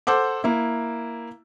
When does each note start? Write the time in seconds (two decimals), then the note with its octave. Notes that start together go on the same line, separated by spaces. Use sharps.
0.07 A4 C5 F#5 D6
0.44 A#3 E4